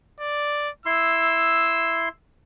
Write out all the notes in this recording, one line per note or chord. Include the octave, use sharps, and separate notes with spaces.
D5
E4 C6 E6